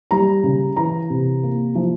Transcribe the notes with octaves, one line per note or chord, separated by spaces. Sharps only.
G3 A#5
C#3
E3 A#5
C3
A#3
F3